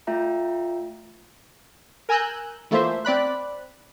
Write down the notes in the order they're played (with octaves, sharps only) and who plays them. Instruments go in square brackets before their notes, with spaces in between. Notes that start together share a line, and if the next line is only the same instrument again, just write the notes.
[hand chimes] A3 F4 E5 G5 A#5
[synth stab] A#4 G#5 A#5 E6 F#6 G6
E3 A3 A#3 F4 C5 E5
C4 D5 B5 F#6